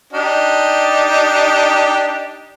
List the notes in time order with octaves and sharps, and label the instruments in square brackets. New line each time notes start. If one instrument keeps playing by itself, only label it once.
[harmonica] D4 D#4 G4